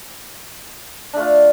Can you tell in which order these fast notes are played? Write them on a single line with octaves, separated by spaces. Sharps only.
D4 A3 F4